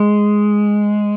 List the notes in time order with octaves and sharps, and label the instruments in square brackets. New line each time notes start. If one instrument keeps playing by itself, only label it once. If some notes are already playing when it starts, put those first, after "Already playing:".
Already playing: [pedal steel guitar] G#3